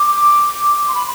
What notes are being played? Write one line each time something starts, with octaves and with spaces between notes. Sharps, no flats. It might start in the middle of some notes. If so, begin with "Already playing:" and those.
Already playing: D6
C6
B5